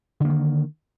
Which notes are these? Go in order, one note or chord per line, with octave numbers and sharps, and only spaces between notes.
D3 D#3 A#3